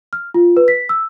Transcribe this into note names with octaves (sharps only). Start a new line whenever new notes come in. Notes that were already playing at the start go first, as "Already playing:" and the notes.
F6
F4
B4
B6
E6